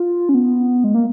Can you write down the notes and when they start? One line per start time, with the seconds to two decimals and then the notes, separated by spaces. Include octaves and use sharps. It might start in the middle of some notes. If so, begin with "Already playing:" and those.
Already playing: F4
0.29 C#4
0.34 B3
0.84 G#3
0.94 A#3